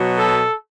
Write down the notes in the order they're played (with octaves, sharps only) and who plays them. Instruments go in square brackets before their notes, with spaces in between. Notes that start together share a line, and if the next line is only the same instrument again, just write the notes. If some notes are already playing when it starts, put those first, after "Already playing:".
Already playing: [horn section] B2 F#3
A4